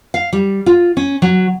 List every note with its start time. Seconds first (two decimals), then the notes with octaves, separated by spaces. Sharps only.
0.14 F5
0.33 G3
0.66 F4
0.97 C#4
1.22 F#3